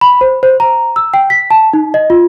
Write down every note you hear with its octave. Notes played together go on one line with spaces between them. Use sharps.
B5
C5
C5
A#5
E6
G5
B6
A5
D#4
D#5
F4